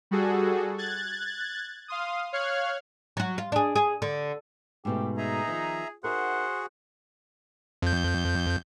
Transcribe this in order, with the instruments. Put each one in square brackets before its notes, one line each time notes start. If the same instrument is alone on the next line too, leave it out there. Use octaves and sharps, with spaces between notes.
[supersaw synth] G3 F#4 G#4 A4
F#6 G#6 A6
F5 C6 D#6
C#5 F5 F6 F#6 G#6
[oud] F#3 F#4
F4
D4 G#4
G#4
D3
[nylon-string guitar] G#2 B2 A3 [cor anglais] G4
[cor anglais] D#4 [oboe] G#4 [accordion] E5 A#5
[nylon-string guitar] D#3 F3
[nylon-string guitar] D#4 A#4 E5 [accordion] F#4 G#4 [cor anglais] C5 [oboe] F#5
[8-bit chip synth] F2 G6